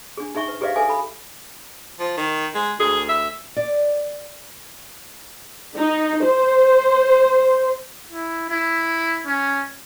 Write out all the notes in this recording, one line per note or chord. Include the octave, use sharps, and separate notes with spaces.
D4 G#4
D#4 G#4 E5 C#6
B4
G4 G#4 B4 D5 E5 F5
A4 B4 E5 G#5 D6
A4 B5
F3
D#3
G#3
D2 G#4
E5
D5
D#4
C5
E4
E4
C#4